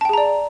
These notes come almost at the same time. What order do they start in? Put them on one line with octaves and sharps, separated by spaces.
A5 G5 G#4 A#5 D5